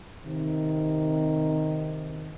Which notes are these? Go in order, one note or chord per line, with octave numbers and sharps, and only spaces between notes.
C3 D#3